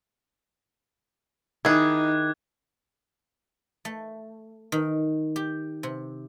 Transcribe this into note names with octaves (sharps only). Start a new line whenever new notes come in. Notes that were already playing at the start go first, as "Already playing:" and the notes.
D#3 D#4 E4 G#4 D6 F#6 G#6
A3
D#3
G4
C3